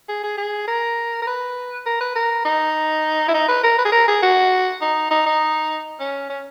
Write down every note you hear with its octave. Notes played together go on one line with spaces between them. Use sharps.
G#4
G#4
G#4
A#4
A#4
B4
A#4
B4
A#4
D#4
E4
D#4
B4
A#4
B4
G#4
A#4
G#4
F#4
D#4
D#4
D#4
C#4
C#4